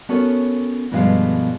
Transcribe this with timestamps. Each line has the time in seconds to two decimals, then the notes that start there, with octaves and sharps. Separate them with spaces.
0.09 B3 C#4 F#4 A4 A#4 C#5
0.91 G2 B2 F3 G#3 A3 F5